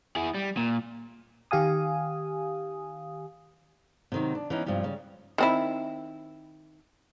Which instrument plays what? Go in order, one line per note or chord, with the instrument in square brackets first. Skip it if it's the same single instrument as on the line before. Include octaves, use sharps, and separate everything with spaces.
[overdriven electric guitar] E4 G#4
G3
A#2
[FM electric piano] D#3 G4 F5 G#5 D#6
[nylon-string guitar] C3 D#3 F#3
D4
E3 B3 C#4 D#4
G2 C3 F3 G3
C#3 G3
[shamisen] D#3 C4 E4